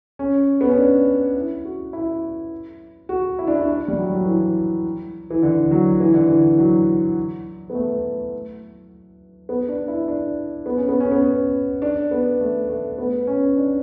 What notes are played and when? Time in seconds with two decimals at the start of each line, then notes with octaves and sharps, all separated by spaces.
0.19 C#4
0.61 B3
0.69 C#4
0.78 D4
1.36 E4
1.65 F#4
1.93 E4
3.09 F#4
3.39 E4
3.47 D4
3.55 E4
3.68 D4
3.88 G3
3.97 F#3
4.15 F#3
4.25 E3
5.30 E3
5.42 D3
5.71 F#3
6.00 E3
6.14 D3
6.27 E3
6.59 F#3
7.70 B3
7.75 A3
9.49 B3
9.68 D4
9.88 E4
10.08 D4
10.66 B3
10.77 C#4
10.89 B3
11.00 C#4
11.11 B3
11.23 C#4
11.82 D4
12.11 B3
12.41 A3
12.69 A3
12.98 B3
13.27 C#4
13.57 D4